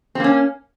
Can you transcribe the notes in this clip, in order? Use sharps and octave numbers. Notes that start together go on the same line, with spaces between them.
A#3 C4 C#4